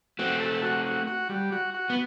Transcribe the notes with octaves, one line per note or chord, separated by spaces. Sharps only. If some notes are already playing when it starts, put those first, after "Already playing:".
A3 C4 F#4
A4
F#4
F#4
F#4
G3
F#4
F#4
B3